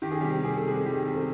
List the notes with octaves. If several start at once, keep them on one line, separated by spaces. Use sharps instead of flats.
D#3 G4
G#4
C3 G3 G4
C3 G#4
A4
C3 G#3 G#4
D#3 G3 G4
C3
A3 A4